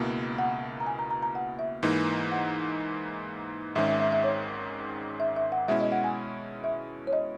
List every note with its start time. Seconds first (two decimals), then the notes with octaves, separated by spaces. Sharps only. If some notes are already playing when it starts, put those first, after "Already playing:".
Already playing: C#2 B2 A#3 E4
0.39 F#5
0.80 A#5
0.87 G#5
0.99 A#5
1.11 A#5
1.23 A#5
1.35 F#5
1.59 E5
1.83 G#2 E3 A#3 D#4
2.32 F#5
3.75 G#1 G#2 D#3 G#3 C#4 E5
3.88 E5
4.00 E5
4.12 E5
4.24 C#5
5.20 E5
5.36 E5
5.52 F#5
5.68 B2 G#3 C#4 E4 E5
5.81 D#5
5.92 F#5
6.04 G#5
6.64 E5
7.07 C#5
7.13 D#5